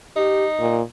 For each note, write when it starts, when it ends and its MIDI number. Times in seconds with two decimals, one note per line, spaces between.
0.16 0.79 63
0.16 0.45 67
0.60 0.81 46